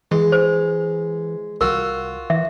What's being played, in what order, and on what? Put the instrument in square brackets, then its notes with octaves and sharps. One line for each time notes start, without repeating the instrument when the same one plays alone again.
[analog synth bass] E3 [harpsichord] G#3
[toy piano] C5
[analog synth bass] C2 [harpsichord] F4 F#4 [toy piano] A#4
[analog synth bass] E3 [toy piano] E5